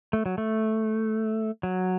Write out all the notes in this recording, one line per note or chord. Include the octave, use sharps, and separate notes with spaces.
A3
F#3
A3
F#3